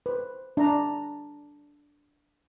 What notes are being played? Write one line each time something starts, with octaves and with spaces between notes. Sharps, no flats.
B4 C5
D4 A#5